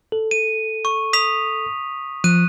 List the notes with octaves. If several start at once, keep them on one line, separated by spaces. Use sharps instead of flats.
A4
D#7
C#6
D#6 B6 F7
F3 F#6 D#7